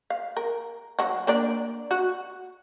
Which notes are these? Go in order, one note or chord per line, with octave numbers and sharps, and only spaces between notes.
F5
A#4
F#3 F#4
A#3 D4 D5
F#4